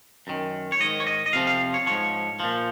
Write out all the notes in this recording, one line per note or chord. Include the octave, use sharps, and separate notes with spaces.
F#2 D#3
C#5
G#2 D#3 D#5
C#5
D#5
D#5
F2 C3 F3 F5
F5
C#5
G#2 F3 C#5
A#2 F3